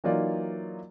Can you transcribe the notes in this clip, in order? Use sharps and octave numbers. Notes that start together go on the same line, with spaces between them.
E3 F#3 A#3 D#4 F4 D5